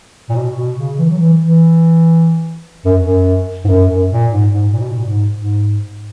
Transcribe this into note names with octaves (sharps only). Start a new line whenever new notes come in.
A#2
B2
B2
C#3
E3
F#3
E3
E3
F#2
F#2
G#2
F#2
F#2
A#2
G#2
G#2
A#2
B2
A#2
G#2
G#2